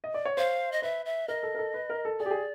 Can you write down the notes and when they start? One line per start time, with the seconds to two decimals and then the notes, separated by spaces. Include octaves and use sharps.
0.04 D#5
0.14 D5
0.25 C#5
0.37 C5 F5
0.72 D#5
0.82 B4 E5
1.06 E5
1.28 A#4 D#5
1.43 A4
1.55 A#4
1.58 A4
1.74 B4
1.90 A#4
2.05 A4
2.19 G#4 D5
2.26 G4
2.31 G#4